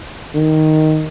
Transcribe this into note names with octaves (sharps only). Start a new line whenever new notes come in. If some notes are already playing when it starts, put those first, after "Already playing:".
D#3